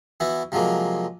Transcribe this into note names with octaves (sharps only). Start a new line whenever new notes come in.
E3 B3 E4 F#4
C3 F3 F#3 G#3 A#3